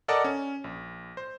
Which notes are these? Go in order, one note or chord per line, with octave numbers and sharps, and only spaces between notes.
A4 A#4 D5 D#5 F#5 A5
C#4
A#1
C5